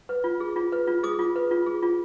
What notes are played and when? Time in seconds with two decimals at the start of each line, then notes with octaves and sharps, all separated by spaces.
0.09 B4
0.24 F4
0.40 G#4
0.56 F4
0.72 B4
0.87 F4
1.03 G#4 D#6
1.19 F4
1.36 B4
1.51 F4
1.66 G#4
1.83 F4